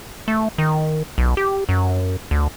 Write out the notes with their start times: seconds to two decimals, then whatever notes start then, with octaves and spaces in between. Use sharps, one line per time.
0.28 A3
0.58 D#3
1.18 B1
1.37 G4
1.69 F#2
2.31 D2